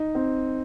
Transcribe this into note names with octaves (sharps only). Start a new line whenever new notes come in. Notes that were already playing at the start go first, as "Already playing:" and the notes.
Already playing: D#4
C4